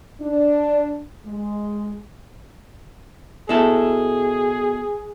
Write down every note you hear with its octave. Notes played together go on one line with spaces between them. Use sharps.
D4
G#3
B2 E4 G#4 A4